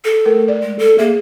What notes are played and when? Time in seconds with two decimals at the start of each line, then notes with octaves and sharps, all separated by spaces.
0.04 A4
0.25 A3 A#4
0.48 D5
0.62 G#3
0.79 A4
0.98 A#3 G#4 E5